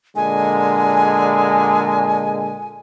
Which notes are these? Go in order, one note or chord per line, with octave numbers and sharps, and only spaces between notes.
A#2 D3 G#3 G#5